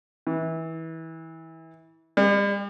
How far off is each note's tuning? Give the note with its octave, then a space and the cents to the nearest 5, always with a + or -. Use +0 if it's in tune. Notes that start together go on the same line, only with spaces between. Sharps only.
E3 -25
G3 +45